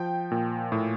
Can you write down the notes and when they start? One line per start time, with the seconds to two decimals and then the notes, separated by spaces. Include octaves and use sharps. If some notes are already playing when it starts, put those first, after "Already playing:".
Already playing: F3 G5
0.31 A#2
0.72 A2